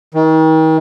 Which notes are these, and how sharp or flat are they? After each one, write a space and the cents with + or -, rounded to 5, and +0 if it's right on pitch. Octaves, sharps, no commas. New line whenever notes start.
D#3 +40